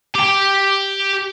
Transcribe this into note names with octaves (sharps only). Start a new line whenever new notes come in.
G4 G5